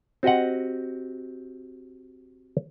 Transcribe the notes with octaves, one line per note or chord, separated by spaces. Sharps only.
C4 F#4 G4 D#5 F#5